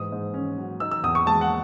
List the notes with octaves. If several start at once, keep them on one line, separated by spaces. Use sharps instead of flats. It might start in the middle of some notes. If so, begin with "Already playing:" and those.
Already playing: G#2 E3 D#6
G#2
C#4
F#3
D#4 E6
E6
E2 D#6
C#6
G#3 A5
F#5